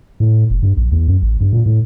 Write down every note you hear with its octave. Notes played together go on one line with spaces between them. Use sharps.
A2
F1
G2
A#1
E2
F#2
A1
G2
A#2
A2